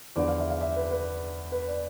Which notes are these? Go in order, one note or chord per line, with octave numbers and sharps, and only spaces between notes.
E2 D3 F3 D5
F5
E5
F5
E5
B4
B4
B4
D5